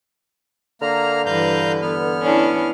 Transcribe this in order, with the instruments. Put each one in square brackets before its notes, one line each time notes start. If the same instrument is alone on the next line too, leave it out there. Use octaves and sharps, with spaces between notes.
[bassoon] D3 [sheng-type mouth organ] A#3 A#5 F6
[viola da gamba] G2 E3 B4 [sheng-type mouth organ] F5 A#5 G6
[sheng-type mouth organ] B3 F6
[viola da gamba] C#4 D4 E4